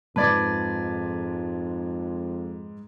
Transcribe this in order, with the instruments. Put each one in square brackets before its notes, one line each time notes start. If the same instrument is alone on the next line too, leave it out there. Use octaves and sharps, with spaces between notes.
[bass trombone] F2 [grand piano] G#2 [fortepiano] B4 D5 D6 [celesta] A5 G#6 A6